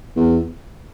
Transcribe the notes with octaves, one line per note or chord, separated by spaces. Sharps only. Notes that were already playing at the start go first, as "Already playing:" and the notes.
E2